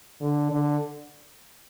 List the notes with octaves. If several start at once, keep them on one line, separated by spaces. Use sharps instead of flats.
D3
D3